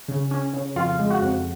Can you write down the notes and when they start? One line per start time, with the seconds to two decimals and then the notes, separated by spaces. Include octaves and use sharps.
0.08 C#3
0.31 C#4
0.54 C#3
0.76 F2 F4 F5
0.99 G#3
1.10 F#4 F#5
1.22 F2